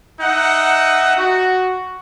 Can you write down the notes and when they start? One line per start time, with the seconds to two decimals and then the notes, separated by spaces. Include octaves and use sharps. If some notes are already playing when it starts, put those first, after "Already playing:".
0.21 D#4 E5 F#5
1.17 F#4